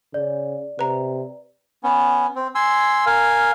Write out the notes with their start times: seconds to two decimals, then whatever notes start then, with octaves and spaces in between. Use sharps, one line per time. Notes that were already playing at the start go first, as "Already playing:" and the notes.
0.14 C#3 D5
0.79 C3 B4 A#5
1.83 B3 C#4
2.35 C4
2.55 G#5 C6 E6
3.06 A#4 F5 G#5